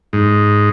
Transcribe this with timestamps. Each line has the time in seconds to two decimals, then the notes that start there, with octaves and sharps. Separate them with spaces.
0.13 G#2